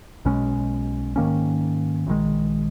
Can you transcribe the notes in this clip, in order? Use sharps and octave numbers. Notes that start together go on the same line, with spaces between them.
B1 B2 G#3 C#4
G#2 D#3 A#3 C#4
A#1 G#2 D#3 G#3